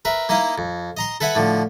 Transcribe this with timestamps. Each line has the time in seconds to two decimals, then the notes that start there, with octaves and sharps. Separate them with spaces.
0.05 A#4 B4 E5
0.29 A#3 D#4 E4 D#5 F5
0.58 F2
0.97 D#5 A#5 C6
1.20 A4 B4 E5 F#5 G#5
1.35 A2 D3 F3